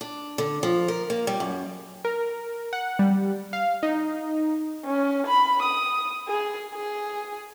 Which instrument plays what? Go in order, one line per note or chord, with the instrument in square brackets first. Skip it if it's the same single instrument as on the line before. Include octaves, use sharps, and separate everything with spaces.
[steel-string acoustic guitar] D4
D3
F3
A#4
A#3
G3
F#2
[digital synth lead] A#4
F#5
G3
F5
D#4
[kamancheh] C#4
B5
D#6
G#4
G#4